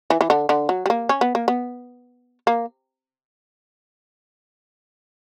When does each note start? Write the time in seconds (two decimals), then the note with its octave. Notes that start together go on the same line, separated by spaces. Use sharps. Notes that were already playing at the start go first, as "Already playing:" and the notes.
0.10 E3
0.21 E3
0.30 D3
0.49 D3
0.69 F#3
0.86 G3
0.90 A#3
1.09 C#4
1.21 B3
1.35 A#3
1.48 B3
2.47 A#3